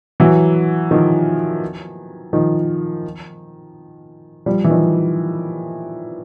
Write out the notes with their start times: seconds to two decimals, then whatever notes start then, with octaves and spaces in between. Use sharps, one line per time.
0.20 E3 F#3
0.91 D#3 F3
2.33 D#3 F3
4.46 F3 G3
4.64 E3
4.70 D#3 F3